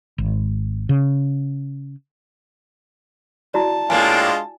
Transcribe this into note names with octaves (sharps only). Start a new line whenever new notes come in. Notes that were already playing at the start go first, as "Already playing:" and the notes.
G#1
C#3
E4 F#4 D5 A5
A2 G#3 A#3 D4 F4 G#5